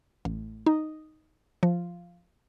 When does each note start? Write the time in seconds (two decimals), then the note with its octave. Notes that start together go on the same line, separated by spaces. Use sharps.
0.25 A1
0.66 D#4
1.63 F3